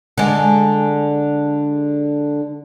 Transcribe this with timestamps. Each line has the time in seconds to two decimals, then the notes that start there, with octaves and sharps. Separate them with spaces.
0.18 D3 G#3